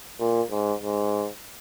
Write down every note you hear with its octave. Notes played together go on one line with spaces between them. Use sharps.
A#2
G#2
G#2